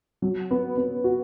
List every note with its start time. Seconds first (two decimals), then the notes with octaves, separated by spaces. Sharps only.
0.22 F#3
0.51 B3
0.77 B3
1.04 F#4